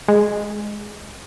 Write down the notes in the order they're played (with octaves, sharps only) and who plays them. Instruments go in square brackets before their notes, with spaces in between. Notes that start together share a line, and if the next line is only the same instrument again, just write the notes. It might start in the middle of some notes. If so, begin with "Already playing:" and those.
[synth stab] G#3